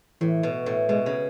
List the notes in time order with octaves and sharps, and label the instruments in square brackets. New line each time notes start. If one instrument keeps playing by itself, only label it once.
[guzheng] A2 [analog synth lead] E3
[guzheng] B2
A2
[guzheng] B2 [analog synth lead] G#3
[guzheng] C#3